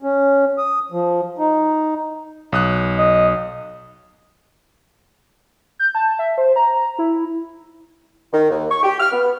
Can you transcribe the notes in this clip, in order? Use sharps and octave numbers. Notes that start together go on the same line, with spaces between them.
C#4
D#6
F3
D#4
B1 D#6 F#6
D#5
G6
A5
E5
C5
A#5
E4
D#3
D#2
C#6
G4
F6
B3